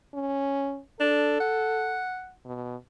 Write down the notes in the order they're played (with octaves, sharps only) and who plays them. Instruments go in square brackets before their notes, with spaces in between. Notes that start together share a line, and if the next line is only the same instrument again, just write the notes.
[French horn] C#4
[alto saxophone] D4 [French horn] A4
[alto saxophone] F#5
[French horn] B2